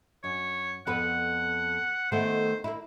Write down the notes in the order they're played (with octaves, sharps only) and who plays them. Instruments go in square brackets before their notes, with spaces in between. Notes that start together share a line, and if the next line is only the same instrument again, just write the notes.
[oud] F#2 [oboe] C#5
[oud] F2 B3 B4 [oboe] F#5
[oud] D#3 A3 B3 [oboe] C5
[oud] A#3 E4